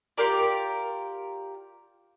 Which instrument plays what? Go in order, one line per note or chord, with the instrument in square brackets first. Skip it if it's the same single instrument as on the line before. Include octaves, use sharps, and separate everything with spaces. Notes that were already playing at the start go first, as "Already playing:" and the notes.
[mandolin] F4 G4 A#4 D5